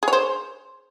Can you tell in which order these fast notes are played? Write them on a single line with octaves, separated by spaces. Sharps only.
G#4 C#5 C5